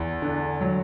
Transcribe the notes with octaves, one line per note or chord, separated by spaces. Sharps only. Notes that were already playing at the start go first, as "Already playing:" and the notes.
Already playing: E2
D3
F#3